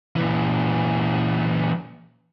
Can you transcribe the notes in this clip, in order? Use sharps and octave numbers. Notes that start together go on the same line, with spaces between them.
A#2 E3